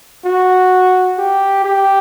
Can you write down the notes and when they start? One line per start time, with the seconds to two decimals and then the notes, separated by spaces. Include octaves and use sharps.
0.25 F#4
1.18 G4
1.65 G4